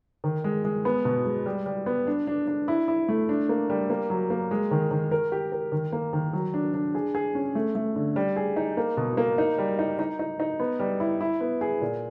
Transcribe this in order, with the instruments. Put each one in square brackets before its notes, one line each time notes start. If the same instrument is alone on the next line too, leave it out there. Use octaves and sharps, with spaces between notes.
[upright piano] D#3
G#3
G#3
B3
B2
G#3
G3
G3
B3
D4
D4
D4
E4
E4
A3
D4
A#3
G3
A#3
F#3
A#3
G#3
D#3
D#3
A#4
G4
A#4
D#3
A#3
D#3
F#3
D4
D4
G#4
G#4
C#4
A3
A3
D3
G3
G#4
D#4
A#3
B2
A#3
D#4
G3
D#4
D#4
D#4
D#4
B3
G3
E4
E4
B3
G#4
A#2